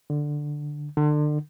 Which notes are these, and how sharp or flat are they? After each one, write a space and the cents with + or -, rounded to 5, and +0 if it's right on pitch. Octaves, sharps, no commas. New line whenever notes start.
D3 +5
D3 +30